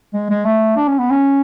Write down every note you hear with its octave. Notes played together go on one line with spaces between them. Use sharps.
G#3
G#3
A3
D4
C#4
B3
C#4